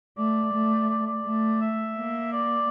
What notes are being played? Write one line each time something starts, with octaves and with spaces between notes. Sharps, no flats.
A3 D5
A3
D5
D5
A3
E5
A#3
D5